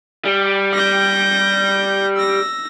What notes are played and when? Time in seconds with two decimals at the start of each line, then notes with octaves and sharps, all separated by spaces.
0.25 G3
0.74 G6 A#6
2.16 E6 A#6